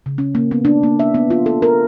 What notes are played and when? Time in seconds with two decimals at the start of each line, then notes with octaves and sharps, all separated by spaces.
0.06 C#3
0.18 C#4
0.35 A#3
0.51 B3
0.65 D4
0.83 A#3
1.00 E5
1.14 B3
1.30 F4
1.46 A4
1.62 A#4